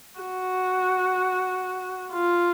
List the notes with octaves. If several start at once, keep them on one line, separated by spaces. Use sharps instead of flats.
F#4
F4